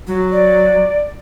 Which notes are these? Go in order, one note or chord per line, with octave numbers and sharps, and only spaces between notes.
F#3
D5